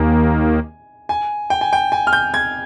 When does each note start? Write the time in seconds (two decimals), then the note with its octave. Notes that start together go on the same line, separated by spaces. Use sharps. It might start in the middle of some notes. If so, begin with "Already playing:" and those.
Already playing: D#2 D#3 A#3 G#5
1.09 G#5
1.50 G5
1.61 G#5
1.73 G5
1.92 G#5
2.07 F6
2.13 G6
2.34 G#6